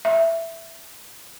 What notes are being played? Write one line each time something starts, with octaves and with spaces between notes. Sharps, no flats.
E5